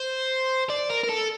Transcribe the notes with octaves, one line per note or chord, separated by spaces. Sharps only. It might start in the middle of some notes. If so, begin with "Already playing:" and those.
Already playing: C5
D5
A#4
A#4
A4